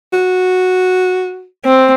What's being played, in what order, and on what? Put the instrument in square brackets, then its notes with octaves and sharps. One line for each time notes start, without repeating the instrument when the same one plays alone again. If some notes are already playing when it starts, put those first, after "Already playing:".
[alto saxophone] F#4
[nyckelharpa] C4